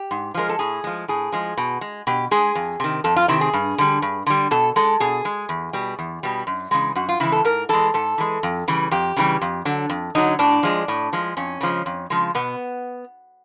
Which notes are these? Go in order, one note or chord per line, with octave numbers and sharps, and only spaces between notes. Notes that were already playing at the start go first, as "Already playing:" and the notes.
Already playing: G4
G#2
F3 G#3 A#4
A4
A2 G#4
F3 G#3
A2 G#4
F3 G#3
B2
G#3
B2 G4
G#3 G#4
F2
C3 D#3
F2 A4
F4
C3 D#3 E4
G#4
G2
D3 G3
G2
D3 G3
B2 A4
G#3 A4
B2 G#4
G#3
E2
B2 G3
E2
B2 G3
F#2
C#3 E3 G#3
F#2 F#4
F4
C#3 E3 G#3 E4
A4
G#2 A#4
E3 G#3 A4
G#2 A4
E3 G#3
F2
C#3 E3 G3
F2 G4
C#3 E3 G3
F2
D3 F#3
F2
D3 F#3 D#4
A2 D4
F3 G#3
A2
F3 G#3
F2 C#4
C#3 F3 G#3
F2
C#3 F3 G#3
B2 B3